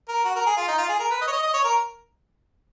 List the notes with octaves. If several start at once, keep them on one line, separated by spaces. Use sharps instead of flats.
A#4
F#4
A#4
G#4
F4
D#4
F4
G#4
A#4
B4
D#5
C#5
D#5
D#5
C#5
A#4